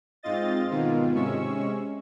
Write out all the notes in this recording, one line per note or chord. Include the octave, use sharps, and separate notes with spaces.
G#2 C4 F4 D#5 A6
G#2 B2 D#3 F4
C3 G#3 C#4 C#6 E6